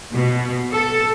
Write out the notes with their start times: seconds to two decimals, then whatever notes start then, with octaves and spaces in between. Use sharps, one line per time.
0.12 B2
0.72 A4